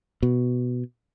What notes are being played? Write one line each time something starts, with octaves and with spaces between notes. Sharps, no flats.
B2